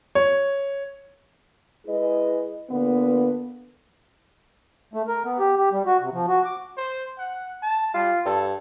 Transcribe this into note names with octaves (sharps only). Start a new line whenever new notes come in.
C#5
G#3 E4 G#4 B4 D#5
A#2 D3 B3
A3
A#4
B3
G4
G4
G3
F#4
C3
F3
F#4
D6
C5
F#5
A5
G3 F4
G2 A4